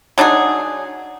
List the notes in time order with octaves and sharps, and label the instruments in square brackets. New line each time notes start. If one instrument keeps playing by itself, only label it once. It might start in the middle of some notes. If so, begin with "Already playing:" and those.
[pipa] F#3 D4 D#4 G#4